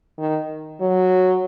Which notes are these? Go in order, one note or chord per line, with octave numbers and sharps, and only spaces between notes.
D#3
F#3